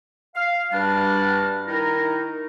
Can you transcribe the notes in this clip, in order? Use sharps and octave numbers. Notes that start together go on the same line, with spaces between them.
F5
G2 G3 D4 F#4 A5 F6
D#3 D#4 E4 A#4